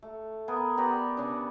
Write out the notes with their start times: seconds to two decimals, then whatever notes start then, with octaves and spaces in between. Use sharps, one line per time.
0.02 A3
0.48 B3 G#4 A#4
0.77 B3 G4 D5 A#5
1.17 C#3 D4